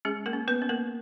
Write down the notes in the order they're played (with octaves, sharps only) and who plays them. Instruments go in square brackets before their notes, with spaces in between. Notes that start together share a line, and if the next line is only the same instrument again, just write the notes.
[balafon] G#3 C#4 G#4
A#3 A#4
C#4
B3 B4
C#4
A#3 A#4